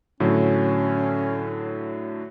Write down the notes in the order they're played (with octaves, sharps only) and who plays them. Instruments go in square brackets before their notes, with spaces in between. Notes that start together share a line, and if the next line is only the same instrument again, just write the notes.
[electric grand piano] A2 D3 F#3 [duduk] C#4